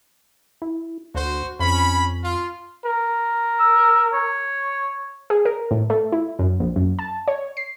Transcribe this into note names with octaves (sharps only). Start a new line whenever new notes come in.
E4
D2 F#4 C5
F2 C#4 B5
F4
A#4
E6
C#5
G#4
A#4
A2
A3
E4
F#2
A#1
F#2
A5
C#5
C7